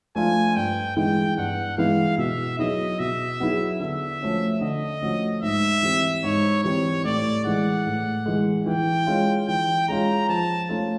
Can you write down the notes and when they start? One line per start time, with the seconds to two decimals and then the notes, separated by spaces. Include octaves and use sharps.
0.15 F3 A3 D4 F4 G#5
0.56 G2 G5
0.97 E3 G#3 B3 E4 G5
1.37 G2 F#5
1.78 E3 G#3 B3 E4 F5
2.18 B2 E5
2.59 F#3 B3 E4 G#4 D#5
2.99 B2 E5
3.40 F#3 B3 E4 G#4
3.80 D3 E5
4.20 F3 A3 C#4 F#4
4.61 D3 D#5
5.02 F3 A3 C#4 F#4
5.42 G#2 E5
5.83 E3 G3 C4
6.24 G#2 C#5
6.64 E3 G3 C4 C#5
7.04 A2 D5
7.45 E3 G#3 F#5
7.86 A2
8.26 E3 G#3
8.66 E3 G5
9.07 G#3 C#4 F4
9.48 E3 G5
9.88 G#3 C#4 F4 A#5
10.29 F3 A5
10.69 A3 C#4 F4 A4